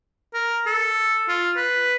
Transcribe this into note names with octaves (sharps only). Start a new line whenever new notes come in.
A#4
A4
F4
B4